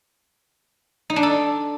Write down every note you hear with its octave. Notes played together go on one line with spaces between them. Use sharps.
D#4
D4
A4